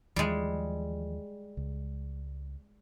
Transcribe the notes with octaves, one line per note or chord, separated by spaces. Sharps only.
D#2 E3 F3 G3 G#3
C#2